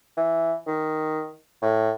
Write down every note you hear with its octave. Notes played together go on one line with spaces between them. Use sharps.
E3
D#3
A2